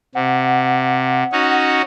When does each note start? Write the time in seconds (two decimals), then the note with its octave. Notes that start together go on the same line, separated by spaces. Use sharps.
0.15 C3 F#5
1.32 C#4 D#4 F#4